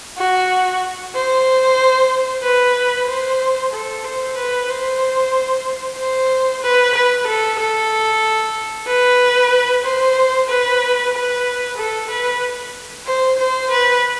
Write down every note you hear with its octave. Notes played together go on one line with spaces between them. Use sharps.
F#4
C5
B4
C5
A4
C5
B4
C5
C5
B4
B4
A4
A4
B4
C5
B4
B4
A4
B4
C5
C5
B4